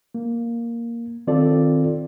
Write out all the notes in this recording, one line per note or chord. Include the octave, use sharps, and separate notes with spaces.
A#3
D#3 C4 F4 A4 D5